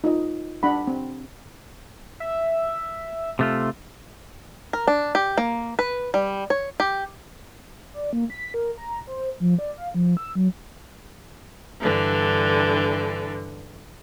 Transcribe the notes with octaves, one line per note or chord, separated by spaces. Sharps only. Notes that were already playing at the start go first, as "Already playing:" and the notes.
D#4 F4 D#5
D4 F#5 B5
C4
E5
C3 A3 F4
A#4
D4
G4
A#3
B4
G3
C#5
G4
D5
A#3
B6
A#4
A#5
C5
F3
D5
F5
F3
E6
F#3
G2 D3 E3